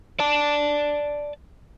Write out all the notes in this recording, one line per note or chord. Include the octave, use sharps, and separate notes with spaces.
D5 A5